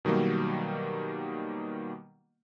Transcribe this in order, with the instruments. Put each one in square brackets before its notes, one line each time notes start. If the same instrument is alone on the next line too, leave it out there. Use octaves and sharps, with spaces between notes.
[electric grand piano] B2 D#3 F#3 G3 A#3